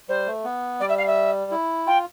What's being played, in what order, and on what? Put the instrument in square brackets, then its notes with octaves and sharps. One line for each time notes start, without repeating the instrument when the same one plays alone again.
[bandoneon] G3 [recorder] C5
[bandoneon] A3
B3
[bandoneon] G3 [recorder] D5
[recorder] E5
F5
E5
[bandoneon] E4
[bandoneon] F4 [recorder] G5